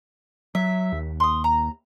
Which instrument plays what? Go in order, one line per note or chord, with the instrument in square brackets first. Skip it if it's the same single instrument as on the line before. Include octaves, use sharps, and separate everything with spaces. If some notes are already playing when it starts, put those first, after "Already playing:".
[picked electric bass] F#3 [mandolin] E5
[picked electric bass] D#2
[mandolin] C6 D#6
A#5